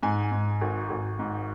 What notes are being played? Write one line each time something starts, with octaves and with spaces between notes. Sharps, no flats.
G#2 G#5
G#2
G#1
G#1
G#2